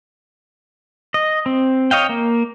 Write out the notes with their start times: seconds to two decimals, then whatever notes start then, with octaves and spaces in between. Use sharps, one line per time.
1.14 D#5
1.46 C4
1.91 C#5 D#5 F5 G5
2.09 A#3